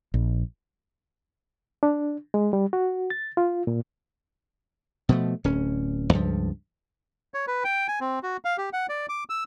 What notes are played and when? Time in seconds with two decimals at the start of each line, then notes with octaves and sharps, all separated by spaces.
0.14 A#1
1.83 D4
2.34 G#3
2.53 G3
2.73 F#4
3.10 A6
3.37 F4
3.67 A#2
5.09 B2 F3 A3
5.44 D1 C#4
6.13 C#2 G2 F3
7.34 C#5
7.47 B4
7.64 G5
7.88 G#5
8.01 C4
8.23 F#4
8.45 F5
8.58 G4
8.73 F#5
8.89 D5
9.09 D6
9.30 E6